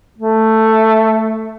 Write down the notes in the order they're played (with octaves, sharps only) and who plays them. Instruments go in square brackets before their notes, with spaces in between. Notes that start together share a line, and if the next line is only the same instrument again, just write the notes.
[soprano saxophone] A3